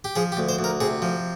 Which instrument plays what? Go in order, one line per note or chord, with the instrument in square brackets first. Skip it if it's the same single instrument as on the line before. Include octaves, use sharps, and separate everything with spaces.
[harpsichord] G4
F3 G#4
G4
D2
C5
D2
A#4
C3 G#4
F3